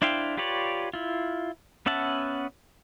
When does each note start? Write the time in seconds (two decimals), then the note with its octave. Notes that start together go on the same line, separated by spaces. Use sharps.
0.02 D4 E4 C5 F5 G5
0.37 F4 G4 B4 C#5 D5
0.94 E4 F4
1.86 B3 C#4 E5 F#5 A5